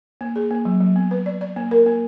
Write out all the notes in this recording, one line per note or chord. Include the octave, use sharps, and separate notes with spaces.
A#3
G#4
A#3
F#3
F#3
B3
B4
D5
D5
A#3
A#4
A#3